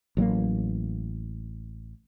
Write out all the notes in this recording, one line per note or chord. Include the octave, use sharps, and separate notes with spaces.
A1 F#3 G3 A#3